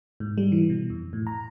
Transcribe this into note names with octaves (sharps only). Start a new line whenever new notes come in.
G#2
G3
E3
B2
F2
A2
A#5